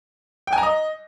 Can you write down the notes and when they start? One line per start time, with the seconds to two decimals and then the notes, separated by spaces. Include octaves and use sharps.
0.47 G5
0.53 G#5
0.58 A#5
0.63 D#5